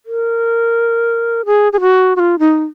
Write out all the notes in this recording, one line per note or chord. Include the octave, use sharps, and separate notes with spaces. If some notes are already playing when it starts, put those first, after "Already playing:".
A#4
G#4
G#4
F#4
F#4
F4
D#4